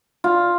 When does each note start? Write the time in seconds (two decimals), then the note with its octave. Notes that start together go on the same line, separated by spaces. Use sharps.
0.24 F4